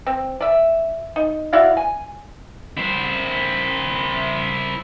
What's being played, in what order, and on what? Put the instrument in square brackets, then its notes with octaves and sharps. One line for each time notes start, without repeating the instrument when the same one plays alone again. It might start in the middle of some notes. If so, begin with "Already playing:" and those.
[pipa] C4
D5 E5
D#4
E4 F#4 D5 F5
G#5
[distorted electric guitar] E4 C5